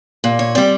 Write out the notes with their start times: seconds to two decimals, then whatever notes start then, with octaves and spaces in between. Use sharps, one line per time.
0.24 A#2
0.39 C#5
0.55 G3 C4 D5